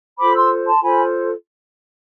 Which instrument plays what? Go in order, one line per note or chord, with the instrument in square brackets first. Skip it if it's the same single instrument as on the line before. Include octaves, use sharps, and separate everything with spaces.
[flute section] F4 A4 C5 B5 D6
C6 E6
A5 C6
F4 A4 C5 G#5 B5